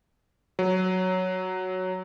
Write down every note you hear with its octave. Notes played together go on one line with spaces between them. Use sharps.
F#3